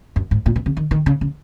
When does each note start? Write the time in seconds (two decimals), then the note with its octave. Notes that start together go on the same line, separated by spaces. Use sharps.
0.16 F#2
0.31 G#2
0.46 A#2
0.56 B2
0.66 C#3
0.77 D#3
0.91 D#3
1.06 C#3
1.21 C#3